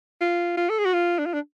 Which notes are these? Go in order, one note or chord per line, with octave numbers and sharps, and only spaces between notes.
F4
F4
A4
G#4
F#4
F4
D4
F4
D4